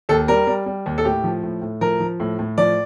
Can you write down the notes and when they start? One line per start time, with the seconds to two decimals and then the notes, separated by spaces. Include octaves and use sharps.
0.09 D#2 A4
0.28 G3 A#4
0.47 G3
0.66 G3
0.86 D#2
0.98 A4
1.04 A2 G4
1.24 F3
1.43 A2
1.62 A2
1.81 F3 A#4
2.00 F3
2.20 A2
2.39 A2
2.58 F3 D5